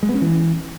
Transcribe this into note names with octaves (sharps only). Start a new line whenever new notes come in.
G#3
B3
C#4
E3